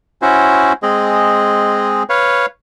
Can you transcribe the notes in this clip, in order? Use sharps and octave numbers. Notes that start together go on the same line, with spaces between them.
C#4 E4 F#4 C5
G#3 C4 G#4 D#5
B4 C#5 F5